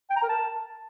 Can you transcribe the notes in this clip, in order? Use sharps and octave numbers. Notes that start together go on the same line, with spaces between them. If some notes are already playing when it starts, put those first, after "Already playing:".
G5
A#5
A#4
A5